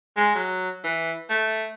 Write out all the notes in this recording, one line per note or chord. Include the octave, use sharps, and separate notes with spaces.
G#3
F#3
E3
A3